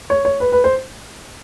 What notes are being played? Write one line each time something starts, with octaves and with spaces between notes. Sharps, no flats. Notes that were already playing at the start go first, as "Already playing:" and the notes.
C#5
C#5
B4
B4
C5